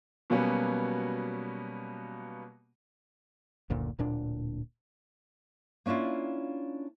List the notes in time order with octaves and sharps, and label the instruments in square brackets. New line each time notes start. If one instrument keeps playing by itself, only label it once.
[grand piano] B2 F#3 G3 A#3 B3 C#4
[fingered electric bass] F#1 D2 A#2
D1 A#2 D4
[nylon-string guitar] A#3 C#4 D4 E4 F4